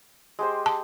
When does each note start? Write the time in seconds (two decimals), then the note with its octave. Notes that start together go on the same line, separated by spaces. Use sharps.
0.39 G#3 G4 C5
0.66 A5